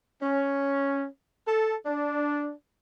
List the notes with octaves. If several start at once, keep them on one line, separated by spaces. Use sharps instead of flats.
C#4
A4
D4